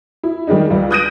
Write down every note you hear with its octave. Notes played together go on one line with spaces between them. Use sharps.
E4
D#3 G3 G#3 D#4
C#2 G3
D#6 F#6 G6 A#6 D7 D#7